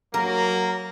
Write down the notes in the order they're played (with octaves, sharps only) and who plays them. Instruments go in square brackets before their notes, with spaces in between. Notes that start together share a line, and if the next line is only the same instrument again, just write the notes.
[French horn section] F#3 [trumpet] A#3 [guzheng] A#4